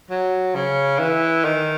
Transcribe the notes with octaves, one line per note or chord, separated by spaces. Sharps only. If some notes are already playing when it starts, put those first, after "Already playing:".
F#3
C#3
E3
D#3